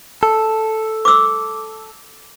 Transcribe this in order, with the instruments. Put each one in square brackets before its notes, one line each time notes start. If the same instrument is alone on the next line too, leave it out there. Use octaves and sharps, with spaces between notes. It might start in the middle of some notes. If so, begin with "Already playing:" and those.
[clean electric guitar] A4
[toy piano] D6 E6